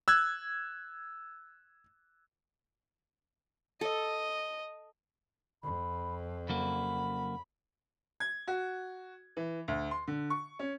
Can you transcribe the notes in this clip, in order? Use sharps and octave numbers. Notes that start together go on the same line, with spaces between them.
E6 F#6 G#6
A4 D#5
F2 B5
C#3 F#3 A#3 F#5 B5
G#6
F#4
E3
D2
C6
D3
C#6
C#4